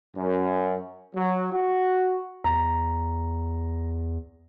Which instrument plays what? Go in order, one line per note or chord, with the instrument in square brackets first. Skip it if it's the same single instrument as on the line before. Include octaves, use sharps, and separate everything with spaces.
[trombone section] F#2
F#3
F#4
[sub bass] E2 [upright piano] A#5